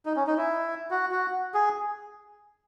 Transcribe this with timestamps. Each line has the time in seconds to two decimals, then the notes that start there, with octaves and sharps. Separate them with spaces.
0.06 D#4
0.16 C#4
0.27 D#4
0.37 E4
0.91 F#4
1.11 F#4
1.54 G#4